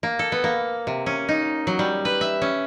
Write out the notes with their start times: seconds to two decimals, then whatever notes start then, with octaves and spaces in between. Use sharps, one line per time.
0.03 A#3
0.19 A4
0.32 B3
0.44 A#3
0.87 C3
1.06 C#4
1.29 D#4
1.67 F#3
1.79 G3
2.05 B4
2.21 E5
2.42 C#4